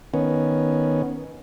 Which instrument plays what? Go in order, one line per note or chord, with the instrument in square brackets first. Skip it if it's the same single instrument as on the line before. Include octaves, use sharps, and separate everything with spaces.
[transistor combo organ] D#3 B3 C#4